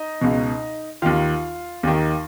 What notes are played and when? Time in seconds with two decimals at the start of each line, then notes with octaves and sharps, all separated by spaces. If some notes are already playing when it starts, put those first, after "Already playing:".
Already playing: D#4 D#5
0.21 C#2 B2
1.02 D#2 D#3 F4 F5
1.83 D#2 D#3